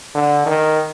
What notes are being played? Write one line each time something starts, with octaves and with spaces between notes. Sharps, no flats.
D3
D#3